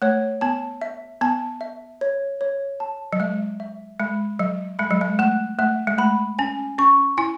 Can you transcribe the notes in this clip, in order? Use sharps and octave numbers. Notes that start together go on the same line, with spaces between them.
A3 C#5
B3 A5
E5
B3 A5
E5
C#5
C#5
A5
F#3
G#3 E5
E5
G#3 B5
F#3 E5
G#3 B5
F#3
G#3
A3 F#6
A3 E5
G#3
A3 B5
C#4 G#5
C#4 C#6
E4 G#5